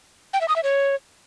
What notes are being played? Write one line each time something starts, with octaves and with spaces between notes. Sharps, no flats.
G5
E5
D#6
E5
C#5